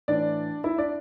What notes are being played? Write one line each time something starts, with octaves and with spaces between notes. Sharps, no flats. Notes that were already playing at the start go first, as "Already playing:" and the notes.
A2 E3 D4 D5
E4 E5
D4 D5